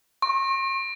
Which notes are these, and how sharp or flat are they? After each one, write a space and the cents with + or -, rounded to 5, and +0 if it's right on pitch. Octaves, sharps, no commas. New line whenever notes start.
C#6 -45